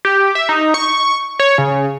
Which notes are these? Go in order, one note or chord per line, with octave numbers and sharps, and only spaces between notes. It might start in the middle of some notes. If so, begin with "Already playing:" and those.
G4
E5
D#4
C#6
C#5
C#3